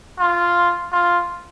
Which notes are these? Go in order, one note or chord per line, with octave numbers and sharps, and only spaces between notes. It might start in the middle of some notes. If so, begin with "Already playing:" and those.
F4
F4